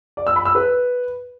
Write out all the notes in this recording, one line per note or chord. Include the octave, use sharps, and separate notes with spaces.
D5
E6
B5
E6
B4